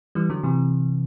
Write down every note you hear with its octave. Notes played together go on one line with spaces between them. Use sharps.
E3 G3
D3 F#3
C3 E3